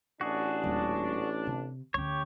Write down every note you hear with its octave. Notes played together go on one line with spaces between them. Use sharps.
A1 D4 F#4 G#4
D#1
C3
D2 C#4 G4 C#5